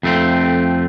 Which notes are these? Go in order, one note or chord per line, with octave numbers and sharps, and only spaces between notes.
F2 A3 C4